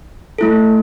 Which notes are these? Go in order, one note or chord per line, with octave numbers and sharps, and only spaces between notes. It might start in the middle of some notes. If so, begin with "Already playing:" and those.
A3 E4 A4